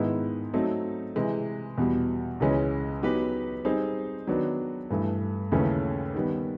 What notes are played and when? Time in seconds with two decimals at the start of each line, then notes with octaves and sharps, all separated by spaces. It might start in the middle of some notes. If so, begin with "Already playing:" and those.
Already playing: G#2 D#3 G#3 B3 E4
0.54 F#3 A3 C4 D#4
1.16 C3 E3 G#3
1.78 E2 B2 G3
2.40 C#2 C#3 E3 G#3 C#4
3.02 F#3 B3 D#4 G4 B4
3.65 G3 C4 D#4 G#4 C5
4.27 D#3 F#3 B3 D4
4.90 G2 E3 A3
5.52 D#2 C#3 E3 A3 C#4
6.14 D#3 G3 B3